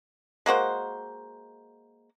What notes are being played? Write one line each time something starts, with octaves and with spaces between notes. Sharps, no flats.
G#3 A#3 F#4 C5